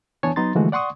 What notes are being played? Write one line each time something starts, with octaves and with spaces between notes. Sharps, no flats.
E3 B3 D4 C#5 G#5 A5
F#3 B3 D#4 A#5 C6 A6
D3 E3 F3 G#3 A3 F#4
D5 F#5 C6 C#6 D#6